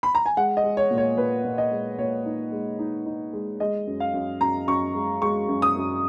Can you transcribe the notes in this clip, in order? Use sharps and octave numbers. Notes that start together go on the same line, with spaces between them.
B5
A#5
G#5
G#3 F#5
D#5
G#3
C#5
A#2
C#5
A#2 B4
A#2
D#5
G#3
A#2 C#5
D#4
G#3
D#4
D#4
G#3
G#3 D#5
F#2
F5
F#2
F#2 A#5
F#2 C#6
G#3
G#3 C#6
F#2
D#6
F#2